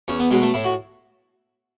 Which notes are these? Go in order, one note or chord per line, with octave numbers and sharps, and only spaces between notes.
E2 C#4
B3
B2 F#3 G#3
A3
A2 E4
F#4